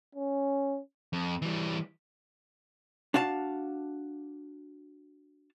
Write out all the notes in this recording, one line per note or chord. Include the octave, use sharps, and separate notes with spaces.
C#4
F2
E3 G3
D4 F#4 F5 A5